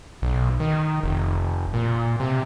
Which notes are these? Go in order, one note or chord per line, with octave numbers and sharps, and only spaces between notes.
B1
D#3
F1
A#2
C3